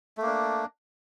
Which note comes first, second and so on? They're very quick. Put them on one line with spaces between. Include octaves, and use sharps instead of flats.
A3 A#3 D4